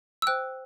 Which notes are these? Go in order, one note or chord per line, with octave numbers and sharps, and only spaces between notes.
E6
C5 G5 F#6